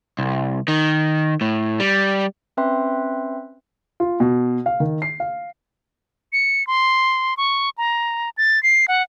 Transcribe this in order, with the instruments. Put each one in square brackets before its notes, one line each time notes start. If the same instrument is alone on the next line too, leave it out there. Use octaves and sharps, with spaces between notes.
[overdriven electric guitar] C2
D#3
A2
G3
[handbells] C4 C#4 B4 E5 G5 C6
[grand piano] F4
B2
F5
D#3
C7
F5
[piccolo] C#7
C6
C#6
A#5
A6
C7
F#5